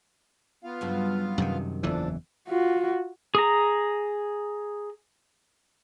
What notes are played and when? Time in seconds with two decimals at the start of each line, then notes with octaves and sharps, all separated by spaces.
0.64 B3 F4 F5
0.81 G2 C#3 F#3
1.38 F#2 C3 D#3
1.83 F#1 E2 E3 F3 D4 A4
2.48 F4 F#4
3.35 G#4 A#5